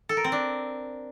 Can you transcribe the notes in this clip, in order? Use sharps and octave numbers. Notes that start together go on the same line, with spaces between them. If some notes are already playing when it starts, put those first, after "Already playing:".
A4
A#4
C4
D4